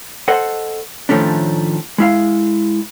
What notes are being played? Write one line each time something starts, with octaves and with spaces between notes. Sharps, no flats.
A4 C5 D#5 F#5
A2 D#3 F3 A3 C#4 D4
G#3 E4 F5